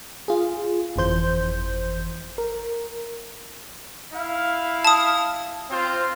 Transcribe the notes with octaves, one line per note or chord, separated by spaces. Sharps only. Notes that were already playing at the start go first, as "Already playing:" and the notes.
F4 G#4
G1 F2 E3 C5 G6
A#4
E4 F5
A5 D#6
C4 F4 C5